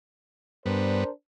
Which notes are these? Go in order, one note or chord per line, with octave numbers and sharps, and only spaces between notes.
G2 B3 D4 A#4 C5